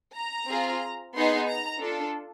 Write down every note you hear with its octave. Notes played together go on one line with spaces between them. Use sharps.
A#5
C4 F4 G#4
B3 D#4 G#4 C6
A#5
D4 F4 A4